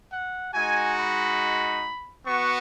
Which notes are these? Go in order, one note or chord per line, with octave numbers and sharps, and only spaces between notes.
F#5
G#3 D#4 F#4 G#5
B5
B3 F#4 C#6